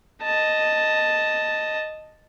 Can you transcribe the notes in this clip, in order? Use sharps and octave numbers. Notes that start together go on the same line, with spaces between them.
D#5 A5